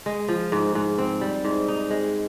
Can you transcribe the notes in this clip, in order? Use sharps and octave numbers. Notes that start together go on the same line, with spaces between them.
G#3
F3
G#2
G#2
C4
G3
G#2
D#4
G#3